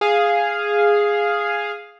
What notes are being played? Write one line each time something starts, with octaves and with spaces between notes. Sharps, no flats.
G#4 F5